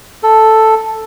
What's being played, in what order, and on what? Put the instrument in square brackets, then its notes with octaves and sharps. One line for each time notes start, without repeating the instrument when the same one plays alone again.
[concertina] A4